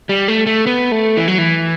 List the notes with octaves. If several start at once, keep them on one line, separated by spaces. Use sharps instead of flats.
G3
A3
A3
B3
A3
E3
F#3
E3